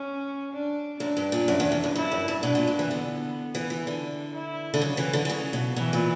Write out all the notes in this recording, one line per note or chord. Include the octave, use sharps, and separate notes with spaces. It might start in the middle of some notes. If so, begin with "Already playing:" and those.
Already playing: C#4
D4
F#2 D4
G2
A#2
F#2
E2
E2
F#2
G2 E4
F#2
G2
B2 D4
A#2
G2
E3
D3 B3
E3
E3
D3 D4
E4
D3
C#3 F#3
E3
D3
D3
C#3
B2
B2 E3
A#2